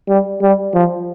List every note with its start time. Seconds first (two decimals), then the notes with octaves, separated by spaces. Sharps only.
0.09 G3
0.42 G3
0.74 F3